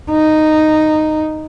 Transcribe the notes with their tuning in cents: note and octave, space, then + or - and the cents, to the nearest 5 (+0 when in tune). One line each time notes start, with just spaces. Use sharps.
D#4 -10